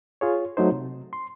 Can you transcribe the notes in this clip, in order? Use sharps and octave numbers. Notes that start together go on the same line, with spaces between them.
F4 G#4 C#5
F#3 A3 D#4 C5
C3
C6